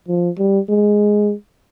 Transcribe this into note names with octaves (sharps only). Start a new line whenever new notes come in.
F3
G3
G#3